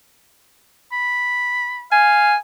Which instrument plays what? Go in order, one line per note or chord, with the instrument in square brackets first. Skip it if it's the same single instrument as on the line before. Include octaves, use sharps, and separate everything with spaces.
[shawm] B5
[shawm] F5 [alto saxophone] G#5